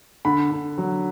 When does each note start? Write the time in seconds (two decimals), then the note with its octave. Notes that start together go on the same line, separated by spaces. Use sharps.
0.25 D3 B5
0.51 D3
0.78 F#3